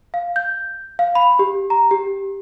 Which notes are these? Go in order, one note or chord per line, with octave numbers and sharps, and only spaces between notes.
F5
G6
F5
B5
G4
A#5
G4